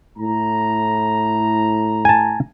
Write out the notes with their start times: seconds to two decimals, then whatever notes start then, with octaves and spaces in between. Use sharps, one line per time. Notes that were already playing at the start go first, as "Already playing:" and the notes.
0.18 A2 A#5
2.05 G#5 A5